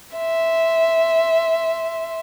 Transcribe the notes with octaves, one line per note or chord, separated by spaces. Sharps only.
E5 C6